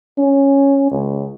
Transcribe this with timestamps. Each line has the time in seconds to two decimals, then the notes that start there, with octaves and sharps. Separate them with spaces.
0.18 C#4
0.91 C#2